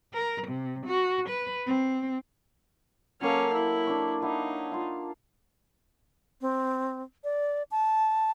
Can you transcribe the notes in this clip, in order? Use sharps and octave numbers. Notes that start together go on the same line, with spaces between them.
A#4
C3
F#4
B4
C4
F#3 A#3 C#4 A4 F5
E4
D4 C#5
F#3 D#4 E4 F5
F4 F5
C4
D5
A5